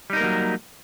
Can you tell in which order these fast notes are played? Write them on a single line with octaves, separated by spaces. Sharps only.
G3 D#4 A#4 A#3 F#3